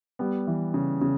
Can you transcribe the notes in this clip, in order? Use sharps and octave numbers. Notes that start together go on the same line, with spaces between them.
G3 B3
E3
C#3
C#3